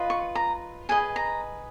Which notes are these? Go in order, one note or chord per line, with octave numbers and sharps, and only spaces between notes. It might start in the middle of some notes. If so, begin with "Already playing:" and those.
Already playing: F4 B4 D#5
C#6
A#5
G#4 B4 D#5 G#5
A#5